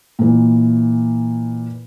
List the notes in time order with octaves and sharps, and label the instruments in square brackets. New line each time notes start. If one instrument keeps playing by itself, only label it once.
[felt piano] A#2 E3